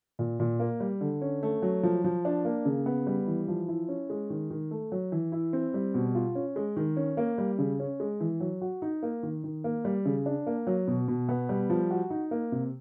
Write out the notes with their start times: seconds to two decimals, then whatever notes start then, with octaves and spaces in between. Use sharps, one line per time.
0.19 A#2
0.40 A#2
0.60 A#3
0.80 G3
1.01 D3
1.22 C#4
1.43 A3
1.62 F#3
1.83 F3
2.04 F3
2.25 D4
2.45 A#3
2.65 C#3
2.86 B3
3.07 G3
3.27 E3
3.48 F3
3.68 E4
3.89 C#4
4.10 G#3
4.30 D#3
4.50 D#3
4.71 A3
4.92 F#3
5.12 E3
5.32 E4
5.53 C4
5.74 G3
5.94 B2
6.15 F4
6.35 C#4
6.56 G#3
6.76 D#3
6.97 C#4
7.17 A#3
7.38 G3
7.59 C#3
7.79 C#4
8.00 G#3
8.20 E3
8.40 F#3
8.61 F#4
8.82 D#4
9.03 A#3
9.23 D#3
9.44 D#3
9.64 A#3
9.85 G3
10.05 C#3
10.26 D4
10.47 A#3
10.67 F#3
10.88 B2
11.08 B2
11.29 B3
11.49 G3
11.70 F3
11.90 F#4
12.10 D#4
12.31 A#3
12.52 C3